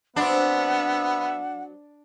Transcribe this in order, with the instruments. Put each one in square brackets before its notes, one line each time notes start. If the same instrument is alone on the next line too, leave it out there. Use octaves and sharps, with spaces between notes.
[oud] F#3 C4 [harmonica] B3 E5 [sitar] D4 [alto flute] F#5